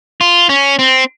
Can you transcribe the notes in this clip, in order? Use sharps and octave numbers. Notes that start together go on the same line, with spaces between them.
F4
C#4
C4